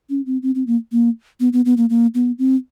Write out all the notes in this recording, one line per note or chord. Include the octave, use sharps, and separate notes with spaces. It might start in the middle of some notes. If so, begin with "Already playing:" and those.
C#4
C4
C4
C4
A#3
A#3
B3
B3
B3
A#3
A#3
B3
C4